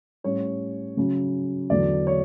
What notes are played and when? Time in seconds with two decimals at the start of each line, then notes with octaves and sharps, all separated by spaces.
0.24 A2 G3 C#4 C#5
0.97 C#3 F#3 C#4
1.70 E2 D3 F#3 D5
2.07 C#5